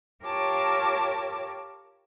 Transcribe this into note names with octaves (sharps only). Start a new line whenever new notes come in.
F4 G4 A#4 C#5 A5 D6